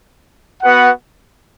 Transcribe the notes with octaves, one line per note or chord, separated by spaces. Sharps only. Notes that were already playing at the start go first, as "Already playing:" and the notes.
B3 F#4 B4 F#5